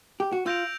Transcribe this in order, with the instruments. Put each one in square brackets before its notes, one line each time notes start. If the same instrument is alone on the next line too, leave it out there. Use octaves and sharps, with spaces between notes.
[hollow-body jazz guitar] G4
F#4
[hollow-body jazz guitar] F4 [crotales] E6 G6 A#6 D7 F7